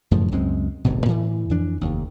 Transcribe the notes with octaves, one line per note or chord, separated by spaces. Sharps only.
F#2 A2 C#3 F3
C#2 F#2 G#3 C4
D1 G1 G#2 B2
A2 E3
F2 E3 D4
F1 D#2